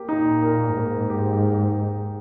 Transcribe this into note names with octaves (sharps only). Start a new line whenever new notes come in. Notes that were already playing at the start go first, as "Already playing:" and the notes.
Already playing: A#3 G4
A#2 D#4
A#4
G#2 A#3
G4